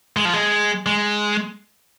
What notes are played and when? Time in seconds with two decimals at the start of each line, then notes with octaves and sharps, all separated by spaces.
0.17 G#3
0.25 F3
0.33 G#3
0.86 G#3